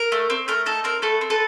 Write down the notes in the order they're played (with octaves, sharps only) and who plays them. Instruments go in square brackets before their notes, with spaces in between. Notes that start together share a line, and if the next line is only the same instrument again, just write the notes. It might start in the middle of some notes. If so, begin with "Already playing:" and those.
Already playing: [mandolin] A#4
A3
C4
A3 A#4
D#4 A4
C4 A#4
A3 A4 B4
C4
A4 B4